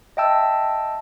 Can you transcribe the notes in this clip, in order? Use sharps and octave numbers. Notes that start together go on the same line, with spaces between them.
D#5 E5 G5 A5 E6